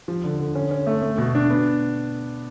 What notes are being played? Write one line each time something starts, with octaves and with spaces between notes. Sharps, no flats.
F3
D3
D3
C#4
C#4
A3
A3
B2
D4
B3